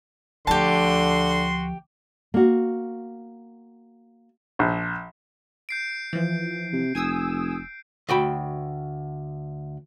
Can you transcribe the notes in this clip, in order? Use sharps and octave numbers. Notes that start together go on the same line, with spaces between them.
D2 D3 F3 F#4 G4 A5 C6
A#3 F#4
A#1
G6 C7 D7
E3 F3
C3
F1 G#5 D#6 E6
D2 F#4 G5 B5